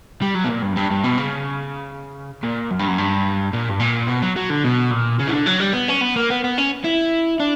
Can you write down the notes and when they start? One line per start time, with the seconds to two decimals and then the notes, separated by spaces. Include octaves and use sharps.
0.22 G3
0.35 F#3
0.45 B2
0.49 A#2
0.62 G2
0.73 F#2
0.77 G2
0.91 G2
1.04 B2
1.18 C#3
2.43 A#2
2.71 F#2
2.79 G2
2.87 F#2
2.98 G2
3.53 A#2
3.69 G2
3.80 A#2
4.08 B2
4.22 F#3
4.36 F#3
4.50 D3
4.64 B2
4.91 A#2
5.20 C#3
5.28 E3
5.33 D3
5.46 F#3
5.60 G3
5.74 B3
5.89 C#4
6.01 B3
6.16 A#3
6.30 B3
6.44 B3
6.58 C#4
6.84 E4
7.40 D4